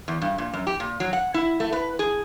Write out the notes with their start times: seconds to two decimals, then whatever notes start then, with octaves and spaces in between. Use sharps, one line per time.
0.08 E2
0.22 G2
0.38 A#2
0.53 F#2
0.67 G4
0.80 A#2
1.00 F#3
1.13 F#5
1.34 E4
1.60 A3
1.72 B4
1.99 G#4